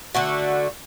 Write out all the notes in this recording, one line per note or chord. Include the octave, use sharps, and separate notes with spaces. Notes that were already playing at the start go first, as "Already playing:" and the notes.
D3 A3 F#4